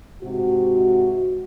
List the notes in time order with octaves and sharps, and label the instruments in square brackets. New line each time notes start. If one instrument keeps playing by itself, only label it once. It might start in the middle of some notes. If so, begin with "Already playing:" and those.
[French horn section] G#2 C3 F#4